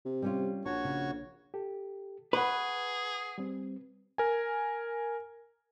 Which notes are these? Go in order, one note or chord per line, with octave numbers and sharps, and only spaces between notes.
C3
G3 C#4 F4
A#1 F#4 C#5 A5 C#6
C#3
G4 A4
G#4 B4 F#5 C#6
G3 C4
A#4 G#5